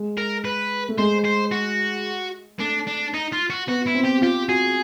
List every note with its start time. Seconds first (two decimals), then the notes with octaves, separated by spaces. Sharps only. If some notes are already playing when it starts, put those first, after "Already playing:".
Already playing: G#3
0.18 A#4
0.45 B4
0.89 A3
0.98 G#3 C5
1.25 C5
1.52 F#4
2.60 A3 D4
2.87 D4
3.14 D#4
3.32 F4
3.50 F#4
3.68 B3 F#4
3.86 E4
3.95 C4
4.03 G4
4.22 F4 G4
4.49 F#4 G#4